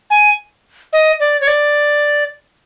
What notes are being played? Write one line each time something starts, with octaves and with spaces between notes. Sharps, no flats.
G#5
D#5
D5
C#5
D5